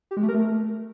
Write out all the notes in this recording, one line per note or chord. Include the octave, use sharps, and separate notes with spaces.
G4
G#3
A3
A#4
A3